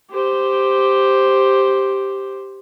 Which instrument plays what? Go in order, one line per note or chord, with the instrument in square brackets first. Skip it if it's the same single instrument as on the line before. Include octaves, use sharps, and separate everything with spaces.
[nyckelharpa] G4 C5